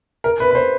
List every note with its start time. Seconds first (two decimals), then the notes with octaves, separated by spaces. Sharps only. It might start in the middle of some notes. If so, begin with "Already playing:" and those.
0.24 A#4
0.40 B4
0.51 B4
0.55 C5